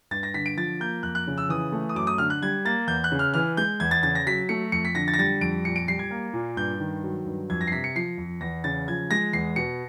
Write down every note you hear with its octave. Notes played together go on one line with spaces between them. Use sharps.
G2 A6
A#6
D3 B6
D7
F3 A6
A#3 G6
F2 F#6
F#6
C#3
E6
E3 D#6
A3
D#6
F#2 D6
D#6
D3 F6
F#6
G3 G#6
A#3 A6
E2 G6
F#6
C#3
F6
E3 F6
G#3 G6
E2 G#6
A6
C#3 A6
A#6
F#3 B6
A3 C#7
F2 C#7
B6
D3 A#6
A6
A#6
G3 A6
F2 D7
A#2 C#7
D7
G3 C7
G#6
A#3
A#2
G2 G6
D#3
F#3
G2
F2 G#6
A#6
C7
C3 B6
C#7
F3 C7
F2
E2 A#6
C#3 A6
F3 G#6
G#3 A#6
E2 C7
B2 C#7